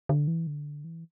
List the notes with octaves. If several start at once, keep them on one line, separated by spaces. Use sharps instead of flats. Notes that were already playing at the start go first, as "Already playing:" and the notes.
D3
E3
D3
E3